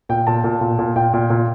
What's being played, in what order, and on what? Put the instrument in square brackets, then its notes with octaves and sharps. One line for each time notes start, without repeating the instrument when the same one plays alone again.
[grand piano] A#2 G5
A#2 A5
A#2
A#2
A#2
A#2 G5
A#2
A#2